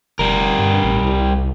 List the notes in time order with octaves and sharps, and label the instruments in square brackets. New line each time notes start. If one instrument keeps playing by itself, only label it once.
[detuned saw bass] F1 [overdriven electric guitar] G3 A#4
[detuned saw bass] G2
A1
C2